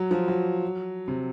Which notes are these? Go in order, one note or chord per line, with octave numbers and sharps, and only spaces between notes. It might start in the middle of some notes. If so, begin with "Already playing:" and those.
Already playing: F#3
F3
F#3
C3